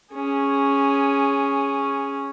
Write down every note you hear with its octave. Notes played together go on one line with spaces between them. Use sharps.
C#4 G#4